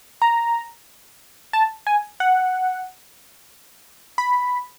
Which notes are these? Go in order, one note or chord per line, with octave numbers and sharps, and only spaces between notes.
A#5
A5
G#5
F#5
B5